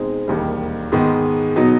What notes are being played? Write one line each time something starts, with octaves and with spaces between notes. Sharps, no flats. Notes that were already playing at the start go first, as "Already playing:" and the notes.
Already playing: B2 G#3 C4 D#4
E1 D#2 D#3 G3
G#2 D#3 G#3 B3
B2 F#3 B3 D#4